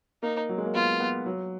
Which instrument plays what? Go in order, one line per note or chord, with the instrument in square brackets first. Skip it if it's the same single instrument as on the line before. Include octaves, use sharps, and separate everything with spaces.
[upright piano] A#3 [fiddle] D#4
[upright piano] F#3
G#3
A#3
[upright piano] B3 [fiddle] F4
[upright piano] B3
F#3